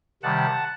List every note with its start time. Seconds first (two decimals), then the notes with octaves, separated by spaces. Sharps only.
0.23 C3 D#3 G3 F#5 A5